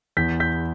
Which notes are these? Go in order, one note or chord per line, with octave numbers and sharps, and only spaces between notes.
E2 G6 B6
G6 B6